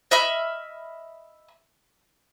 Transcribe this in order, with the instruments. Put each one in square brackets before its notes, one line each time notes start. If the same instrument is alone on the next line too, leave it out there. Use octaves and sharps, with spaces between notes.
[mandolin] D#5 E5 B5 F6